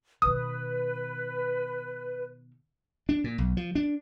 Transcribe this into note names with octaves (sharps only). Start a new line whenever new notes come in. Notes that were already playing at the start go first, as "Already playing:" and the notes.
B2 D#3 B4 D#6
D4
A#2
B1
F3
D4